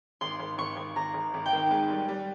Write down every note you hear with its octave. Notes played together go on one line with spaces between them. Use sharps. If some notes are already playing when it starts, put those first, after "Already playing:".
G#1 C6
G#1
G#1 C#6
G#1
G#1 A#5
G#1
G#1
G5
D#3
G#2
G3
G3